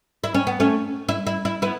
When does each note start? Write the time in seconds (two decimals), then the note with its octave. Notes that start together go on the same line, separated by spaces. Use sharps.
0.24 E4
0.34 C#4
0.47 B3
0.60 A3 C#4
1.09 E4
1.27 E4
1.45 E4
1.62 B3 E4